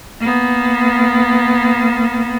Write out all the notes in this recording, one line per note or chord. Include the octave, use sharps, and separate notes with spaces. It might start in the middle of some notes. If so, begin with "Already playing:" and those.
A#3 B3